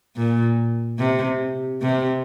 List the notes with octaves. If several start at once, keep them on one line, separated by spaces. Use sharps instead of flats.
A#2
C3
C3